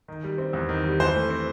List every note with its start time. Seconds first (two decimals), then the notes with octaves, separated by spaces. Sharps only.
0.08 D#3
0.24 G3
0.38 C4
0.53 E2
0.69 D#3
0.84 G3
1.00 E3 C5
1.15 A3
1.30 C4